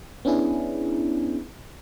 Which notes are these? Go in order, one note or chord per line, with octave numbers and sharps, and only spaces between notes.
B3 C#4 D4 E4 G#4